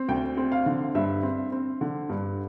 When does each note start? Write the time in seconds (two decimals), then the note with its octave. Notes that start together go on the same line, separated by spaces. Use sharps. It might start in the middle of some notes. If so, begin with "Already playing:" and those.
Already playing: C4
0.08 D2 G5
0.37 C4
0.52 F5
0.66 D3
0.95 G2 E5
1.23 C4
1.52 C4
1.81 D3
2.09 G2